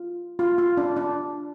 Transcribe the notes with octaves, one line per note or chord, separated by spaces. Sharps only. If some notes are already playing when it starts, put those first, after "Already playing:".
Already playing: F4
F4
F4
D4
D4